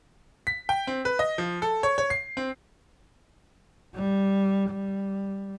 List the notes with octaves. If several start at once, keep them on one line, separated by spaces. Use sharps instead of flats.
B6
G5
C4
B4
D#5
F3
A4
C#5
C#5
C7
C4
G3
G3